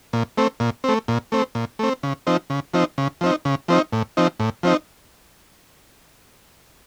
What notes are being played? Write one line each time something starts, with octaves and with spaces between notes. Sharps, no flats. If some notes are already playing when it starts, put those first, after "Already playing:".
A#2
A3 C4
A#2
A3 C4
A#2
A3 C4
A#2
A3 C4
C#3
F3 C4 D#4
C#3
F3 C4 D#4
C#3
F3 C4 D#4
C#3
F3 C4 D#4
A2
F3 C4 D#4
A2
F3 C4 D#4